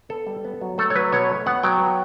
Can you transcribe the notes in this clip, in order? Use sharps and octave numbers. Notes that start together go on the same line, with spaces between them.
B3 A4
G3
B3
F#3
A3 A4
C#5
F#3 B4
B2 C#5
A3
B3 F#5
F#3 G5
B3